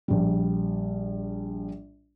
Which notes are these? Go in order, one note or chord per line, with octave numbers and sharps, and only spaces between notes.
A#1 G3